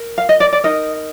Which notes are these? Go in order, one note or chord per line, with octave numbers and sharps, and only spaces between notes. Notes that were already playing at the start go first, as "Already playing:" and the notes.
Already playing: A#4
F5
D#5
D5
D5
D#4 A#4 D#5